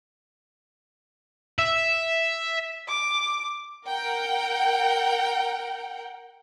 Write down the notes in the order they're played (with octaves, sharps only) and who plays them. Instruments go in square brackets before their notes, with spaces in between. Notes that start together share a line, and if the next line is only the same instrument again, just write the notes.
[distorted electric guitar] E5
[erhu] D6
[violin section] A#4 F#5 G5